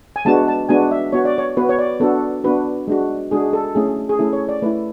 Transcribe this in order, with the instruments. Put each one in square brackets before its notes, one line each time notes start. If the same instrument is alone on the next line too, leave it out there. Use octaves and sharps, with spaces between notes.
[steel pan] G#5
G#3 B3 D4 F#4 A5
A5
G#3 B3 D4 F#4 G#5
E5
B3 F#4 C#5
D5
C#5
B3 F#4 B4
C#5
D5
B3 D4 F#4 A4
B3 D4 F#4 B4
G#3 D4 F#4
G#3 D4 F#4 G#4
A4
A3 C#4 E4 G#4
G#4
A3 C#4 E4 A4
C#5
D5
A3 E4 B4